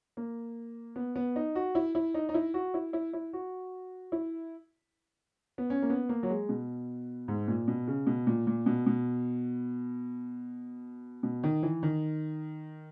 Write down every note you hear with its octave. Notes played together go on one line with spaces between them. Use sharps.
A#3
B3
B3
D#4
F#4
E4
E4
D#4
D#4
E4
F#4
E4
E4
E4
F#4
E4
B3
C#4
A#3
B3
A#3
F#3
G#3
B2
G#2
A#2
B2
C#3
B2
A#2
A#2
B2
B2
B2
D#3
E3
D#3